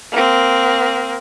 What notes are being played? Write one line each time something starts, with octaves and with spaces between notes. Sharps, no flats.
A#3 C4